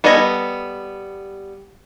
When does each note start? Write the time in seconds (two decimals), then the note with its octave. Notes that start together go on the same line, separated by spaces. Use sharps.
0.04 G3 B3 A4 D#5 G#5